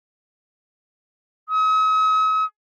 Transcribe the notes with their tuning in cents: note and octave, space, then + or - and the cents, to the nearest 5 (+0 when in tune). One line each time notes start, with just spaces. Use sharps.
D#6 +45